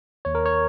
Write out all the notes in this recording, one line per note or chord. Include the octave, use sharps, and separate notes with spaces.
D#2 C#5
A#4
C#5